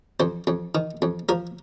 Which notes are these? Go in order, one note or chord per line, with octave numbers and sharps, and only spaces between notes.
F2 C5
F2
D#3
F2
F3 A#4